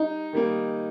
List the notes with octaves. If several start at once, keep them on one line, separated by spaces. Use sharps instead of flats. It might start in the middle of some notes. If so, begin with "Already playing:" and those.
Already playing: G3 D#4
D#3 G3 A#3